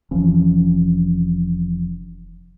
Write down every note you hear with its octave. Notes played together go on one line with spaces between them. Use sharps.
F1 E3 F3 C#4